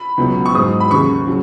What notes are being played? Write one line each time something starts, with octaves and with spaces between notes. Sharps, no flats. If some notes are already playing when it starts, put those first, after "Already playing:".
Already playing: B5
C#2 B2 F#3
C#6
G#2 F#3 D#6
B5
D#2 C#3 F#3 C#6
C#3 F#3